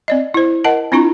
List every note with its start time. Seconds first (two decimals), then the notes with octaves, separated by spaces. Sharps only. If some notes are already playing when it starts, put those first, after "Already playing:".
0.08 C4 D5 D#5
0.34 E4 C5
0.64 A#4 D#5 F#5 A5
0.92 C4 D4 E4 F4 A#5